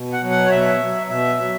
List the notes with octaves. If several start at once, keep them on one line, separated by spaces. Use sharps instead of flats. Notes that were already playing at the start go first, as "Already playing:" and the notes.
Already playing: B2
F#5
F#3
F#5
C#5
B2 E5
F#3
B2 E5
F#3